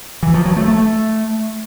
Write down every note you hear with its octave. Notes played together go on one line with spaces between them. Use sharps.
E3
F3
F#3
A3
A3